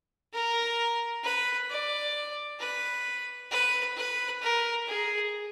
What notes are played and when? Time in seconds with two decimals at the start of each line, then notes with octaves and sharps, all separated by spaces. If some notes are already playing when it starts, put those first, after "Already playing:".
0.33 A#4
1.23 B4
1.69 D5
2.59 B4
3.51 B4
3.96 B4
4.41 A#4
4.87 G#4